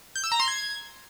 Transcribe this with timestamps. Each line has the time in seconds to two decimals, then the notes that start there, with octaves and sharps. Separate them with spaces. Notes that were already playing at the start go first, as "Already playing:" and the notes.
0.15 G6
0.24 E6
0.32 A#5
0.40 C6
0.48 G#6